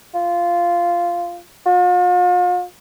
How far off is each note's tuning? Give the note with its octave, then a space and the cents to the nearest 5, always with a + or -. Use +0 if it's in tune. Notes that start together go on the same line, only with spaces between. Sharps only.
F4 -10
F4 +45